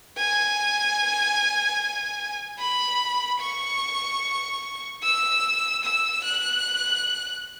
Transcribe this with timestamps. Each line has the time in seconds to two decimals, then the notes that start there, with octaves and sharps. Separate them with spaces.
0.17 G#5
2.59 B5
3.41 C#6
5.03 E6
5.84 E6
6.24 F#6